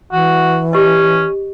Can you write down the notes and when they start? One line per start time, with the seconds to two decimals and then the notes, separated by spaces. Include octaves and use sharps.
0.12 E3 F#4
0.73 C#4 G4 D#5